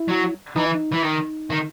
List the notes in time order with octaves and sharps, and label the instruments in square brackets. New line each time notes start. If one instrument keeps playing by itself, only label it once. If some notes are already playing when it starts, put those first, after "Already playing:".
Already playing: [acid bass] E4
[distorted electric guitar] F#3
[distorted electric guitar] E3 [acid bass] D#4
[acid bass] E4
D#4
[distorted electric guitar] E3 [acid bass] E4
[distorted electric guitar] D#3 [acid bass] D#4
[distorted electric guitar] D#3